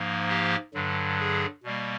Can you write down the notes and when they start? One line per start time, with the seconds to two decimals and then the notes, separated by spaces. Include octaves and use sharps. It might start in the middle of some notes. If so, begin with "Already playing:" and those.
Already playing: G#2 F3 A#3
0.29 G4
0.74 G2 D3 F#3
1.19 G#4
1.63 B2 G3 A#3